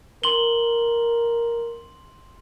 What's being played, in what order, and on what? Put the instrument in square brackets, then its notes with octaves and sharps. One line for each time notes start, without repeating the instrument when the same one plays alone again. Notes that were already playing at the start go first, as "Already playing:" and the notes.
[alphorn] A#4 [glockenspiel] C6 F#7 G7